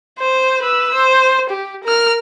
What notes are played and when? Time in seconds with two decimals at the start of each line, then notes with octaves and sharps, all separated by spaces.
0.19 C5
0.62 B4 E6
0.94 C5
1.50 G4
1.84 A#4 F6